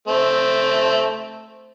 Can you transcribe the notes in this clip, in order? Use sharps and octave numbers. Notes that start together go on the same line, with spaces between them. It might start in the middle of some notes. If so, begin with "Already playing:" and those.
A3 C4